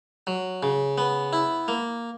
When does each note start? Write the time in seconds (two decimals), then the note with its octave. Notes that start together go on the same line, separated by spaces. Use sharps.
0.27 F#3
0.63 C#3
0.98 B3
1.33 E4
1.68 A#3